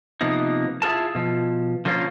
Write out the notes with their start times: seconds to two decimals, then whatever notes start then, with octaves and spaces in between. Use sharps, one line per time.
0.21 C3 F3 A#3 B3 D#4
0.82 E4 F4 G#4 A#4 A5
1.15 B2 F3
1.85 D3 F3 A#3 C#4 F4 C5